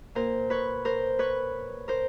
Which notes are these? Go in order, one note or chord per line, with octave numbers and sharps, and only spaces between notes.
A#2 A#4 C5
B4 C#5
A#4 C5
B4 C#5
A#4 C5